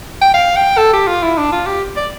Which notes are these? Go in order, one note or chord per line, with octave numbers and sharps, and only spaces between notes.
G5
F5
G5
A4
G4
F4
E4
D4
F4
G4
D5